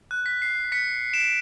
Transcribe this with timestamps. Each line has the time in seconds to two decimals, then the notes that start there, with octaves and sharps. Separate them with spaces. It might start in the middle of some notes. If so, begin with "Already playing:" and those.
0.11 F#6
0.26 B6
0.42 C7
0.72 B6 C#7
1.13 D7 E7
1.24 D7 E7